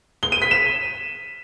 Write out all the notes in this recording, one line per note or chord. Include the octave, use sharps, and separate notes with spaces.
G7
D#7
B6
E7